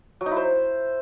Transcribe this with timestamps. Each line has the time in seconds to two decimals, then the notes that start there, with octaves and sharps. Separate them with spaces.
0.21 F#3
0.26 D#4
0.31 E4
0.36 C5